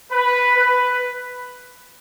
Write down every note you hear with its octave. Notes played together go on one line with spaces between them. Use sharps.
B4
B4